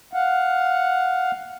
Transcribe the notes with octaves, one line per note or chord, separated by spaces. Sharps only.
F5 F#5